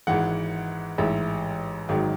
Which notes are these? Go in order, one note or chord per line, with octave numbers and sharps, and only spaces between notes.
G#1 G#2 E3 F#5
A1 G#2 E3 E5
G#1 G#2 D#3 F#3